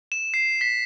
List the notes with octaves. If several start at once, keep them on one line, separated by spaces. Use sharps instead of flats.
E7
C7
B6